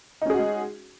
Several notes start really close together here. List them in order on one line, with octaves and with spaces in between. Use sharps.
D#4 C#4 G#4 F#4 G#3